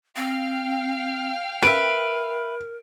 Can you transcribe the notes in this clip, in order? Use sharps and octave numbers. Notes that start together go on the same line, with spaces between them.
C4 F5 G5 F6
A#4 B4 E5 D7